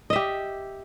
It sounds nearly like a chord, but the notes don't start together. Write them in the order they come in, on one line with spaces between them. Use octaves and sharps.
D#5 E5 G4